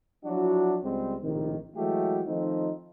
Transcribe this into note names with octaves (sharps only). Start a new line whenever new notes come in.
F3 F#3 D4 E4 F#4
C#2 G3 G#3 C4
A#1 A2 C3 D#3
E3 F#3 G#3 A3 F#4 G4
D#3 F3 A3 C4 D#4